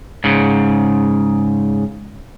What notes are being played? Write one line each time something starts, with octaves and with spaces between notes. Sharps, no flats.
G#2 C#3